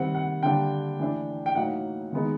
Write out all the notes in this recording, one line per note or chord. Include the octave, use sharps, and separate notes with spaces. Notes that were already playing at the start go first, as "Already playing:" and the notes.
Already playing: C3 D#3 G3 C4 F#5
F#5
D3 G3 A#3 D4 G5
E3 A3 D4
G5
A2 F#3 A#3 D#4 F#5
D#3 G#3 B3 D#4